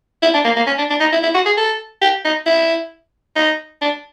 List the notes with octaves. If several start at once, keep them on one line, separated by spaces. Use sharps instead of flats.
E4
D4
A#3
A#3
C#4
D4
D4
D#4
E4
E4
F#4
G#4
A4
G4
D#4
E4
D#4
D4